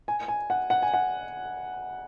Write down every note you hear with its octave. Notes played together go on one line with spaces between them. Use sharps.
G#5
G#5
F#5
F#5
G#5
F#5